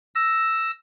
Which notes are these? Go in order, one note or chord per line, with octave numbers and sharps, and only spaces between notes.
E6 A#6